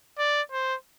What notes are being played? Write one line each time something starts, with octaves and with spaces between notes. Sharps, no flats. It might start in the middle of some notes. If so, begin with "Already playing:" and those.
D5
C5